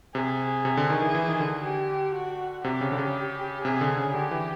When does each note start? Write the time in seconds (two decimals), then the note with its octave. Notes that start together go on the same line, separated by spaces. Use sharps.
0.15 C3 G#4
0.65 C3
0.77 D3
0.90 D#3
1.02 E3
1.15 E3
1.28 D#3
1.40 D3
1.65 G4
2.15 F#4
2.64 C3 G4
2.81 C#3
2.92 D3
2.98 C#3
3.64 C3 G#4
3.81 D3
3.98 C#3
4.14 D3 G4
4.31 E3